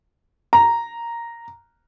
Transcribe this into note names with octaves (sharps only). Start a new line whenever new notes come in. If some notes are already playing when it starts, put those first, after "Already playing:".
A#5